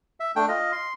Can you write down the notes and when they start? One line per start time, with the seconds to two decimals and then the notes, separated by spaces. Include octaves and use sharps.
0.20 E5
0.36 A3 D4 G5
0.49 F4 D#5
0.72 C6